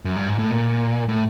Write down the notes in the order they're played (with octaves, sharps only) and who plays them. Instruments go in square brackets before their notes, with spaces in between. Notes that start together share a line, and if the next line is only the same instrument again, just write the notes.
[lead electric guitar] F#2
G2
G#2
A2
A#2
A2